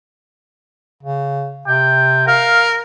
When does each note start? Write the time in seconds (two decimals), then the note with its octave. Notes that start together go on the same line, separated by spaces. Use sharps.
1.03 C#3
1.67 C3 G5
2.28 A#4 F5